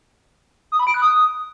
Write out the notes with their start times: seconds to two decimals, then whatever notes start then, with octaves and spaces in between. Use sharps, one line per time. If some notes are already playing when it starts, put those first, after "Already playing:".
0.72 D#6
0.79 B5
0.87 D7
0.94 F#6
1.02 D#6